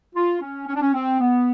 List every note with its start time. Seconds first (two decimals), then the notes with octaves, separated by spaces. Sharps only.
0.15 F4
0.42 C#4
0.68 C#4
0.75 D4
0.82 C#4
0.94 C4
1.20 B3